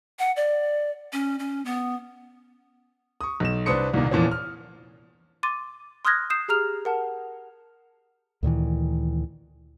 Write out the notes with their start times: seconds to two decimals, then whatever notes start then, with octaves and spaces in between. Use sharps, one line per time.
0.19 F#5
0.36 D5
1.13 C#4
1.39 C#4
1.65 B3
3.21 C#6 D#6
3.40 B1 E7
3.66 C2 D4 B4 C5 D#6 C#7
3.94 C2 A#2 D#3 A#3
4.11 E2 A#2 E3 F3 C#4
4.31 F6
5.43 C6 D6 A6 D#7
6.05 C6 D#6 F6 F#6 G#6 A#6
6.30 D#6 G6 C7 E7
6.48 G4 G#4 A#5 F6 F7
6.85 A#4 F#5 A5
8.43 D2 A#2 D#3 E3